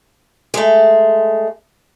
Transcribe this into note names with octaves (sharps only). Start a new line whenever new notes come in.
G#3 A3